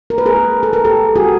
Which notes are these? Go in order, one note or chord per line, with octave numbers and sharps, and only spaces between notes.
A#4
B4
G#4 A#4
A4
A#4
G4 A4
F#4 G#4